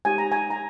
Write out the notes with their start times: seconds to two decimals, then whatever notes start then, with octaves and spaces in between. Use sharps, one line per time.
0.05 G#3 D#4 G4 G#5
0.18 A#5
0.32 G#5
0.50 A#5